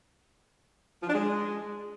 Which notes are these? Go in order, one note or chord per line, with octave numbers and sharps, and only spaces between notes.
F3
D4
G#3